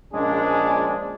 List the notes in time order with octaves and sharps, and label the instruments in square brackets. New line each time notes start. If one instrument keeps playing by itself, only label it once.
[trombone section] A#1 A#2 G#3 C#4 D4 G#4